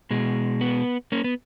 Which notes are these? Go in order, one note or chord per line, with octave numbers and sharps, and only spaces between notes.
B2 G#3
B3
A#3 C#4
B3